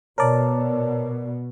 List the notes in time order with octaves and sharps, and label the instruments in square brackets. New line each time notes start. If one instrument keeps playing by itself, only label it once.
[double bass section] B2 [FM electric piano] A#4 D5 [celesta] C#5 A5